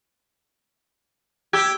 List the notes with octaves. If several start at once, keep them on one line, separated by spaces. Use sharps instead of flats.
G4 E6 G#6